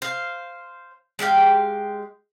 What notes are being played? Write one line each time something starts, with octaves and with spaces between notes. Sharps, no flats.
C5 F5
G#3 G4 F5 G5